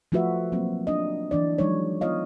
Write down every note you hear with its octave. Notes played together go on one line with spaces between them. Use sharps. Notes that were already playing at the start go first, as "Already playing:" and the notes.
F3 A3 F4 F#4 B4 E5
F#3 A#3 C4
D4 D#5
E3 D4 D5
F3 F#3 G#3 D#4 C#5
B3 F4 C#5 D#5 F5